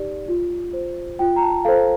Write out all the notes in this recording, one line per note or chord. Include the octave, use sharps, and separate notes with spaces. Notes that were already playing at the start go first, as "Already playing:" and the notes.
Already playing: D#4 G4 D5
F4
C5
F4 G5
A#5
A5
A4 C5 F5